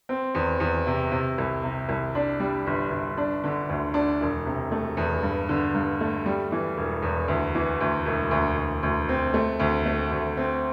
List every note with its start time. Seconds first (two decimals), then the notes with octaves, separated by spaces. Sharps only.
0.09 C4
0.34 E2
0.60 E2
0.87 C3
1.12 C3
1.38 C2
1.64 C3
1.89 C2
2.15 D4
2.40 G3
2.67 G1
2.91 G1
3.17 D4
3.44 D3
3.69 D2
3.94 D4
4.21 E1
4.46 C3
4.71 A3
4.97 E2
5.23 G2
5.49 D3
5.74 G2
6.01 A3
6.26 G3
6.52 E3
6.77 E1
7.02 E2
7.28 D2
7.55 E3
7.80 D2
8.06 E1
8.31 D2
8.57 D2
8.83 D2
9.09 C4
9.34 A3
9.60 D2
9.85 A3
10.11 D2
10.37 C4